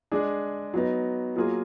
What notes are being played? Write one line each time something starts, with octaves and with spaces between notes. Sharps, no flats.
G#3 D4 G#4
F#3 B3 D#4
F#3 A#3 F4 G#4